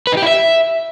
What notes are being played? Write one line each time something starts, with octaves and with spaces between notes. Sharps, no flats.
B4
D#4
G4
E4
E5